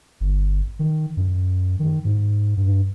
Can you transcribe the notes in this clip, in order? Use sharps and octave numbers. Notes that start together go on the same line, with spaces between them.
G1
D#3
F#2
D#3
G#2
G2